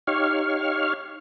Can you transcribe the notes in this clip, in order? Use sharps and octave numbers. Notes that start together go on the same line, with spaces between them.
D#4 G4 C#5 F5 C#6 F6